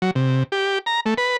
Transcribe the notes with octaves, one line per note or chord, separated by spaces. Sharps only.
F#3
C3
G4
A#5
A3
B4